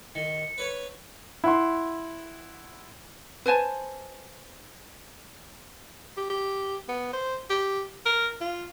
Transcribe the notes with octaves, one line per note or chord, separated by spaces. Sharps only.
D#3 C#7
B4 C#5
E4 F#5 C6
B4 C5 G#5 A5
G4
G4
B3
C5
G4
A#4
F4